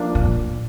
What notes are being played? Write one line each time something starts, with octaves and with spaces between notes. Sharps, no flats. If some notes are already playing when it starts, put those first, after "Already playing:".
Already playing: F3 A#3 D4
A#2